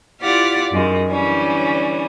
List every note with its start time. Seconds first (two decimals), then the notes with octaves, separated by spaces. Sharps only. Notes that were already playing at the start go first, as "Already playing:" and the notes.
0.21 E4 F4 G4 D5 F5 F#5
0.72 F#2 D#3 G#3
1.08 D3 E3 G3 C#4